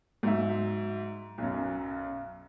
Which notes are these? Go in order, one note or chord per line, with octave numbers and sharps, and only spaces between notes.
G#2 F#3 E5
B1 F#2